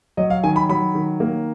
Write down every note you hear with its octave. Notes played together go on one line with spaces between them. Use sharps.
F#3 D#5
F5
D#3 G#5
B5
F#3 B5
D#3
A#3